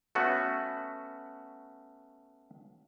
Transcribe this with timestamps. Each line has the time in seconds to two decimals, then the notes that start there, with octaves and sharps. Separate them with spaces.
0.15 A3 B3 C#4 F#4